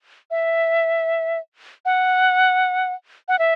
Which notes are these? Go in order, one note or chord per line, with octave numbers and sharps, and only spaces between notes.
E5
F#5
F#5
E5